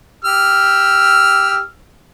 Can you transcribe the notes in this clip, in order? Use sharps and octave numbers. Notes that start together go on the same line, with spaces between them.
G4 E6 F6